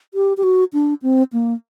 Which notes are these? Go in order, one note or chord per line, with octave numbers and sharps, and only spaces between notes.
G4
G4
F#4
D4
C4
A#3